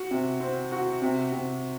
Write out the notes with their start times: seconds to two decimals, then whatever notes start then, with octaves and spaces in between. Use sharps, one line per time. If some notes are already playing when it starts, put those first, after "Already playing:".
Already playing: F#4
0.11 C3
0.40 C4
0.72 F#4
1.02 C3
1.32 C3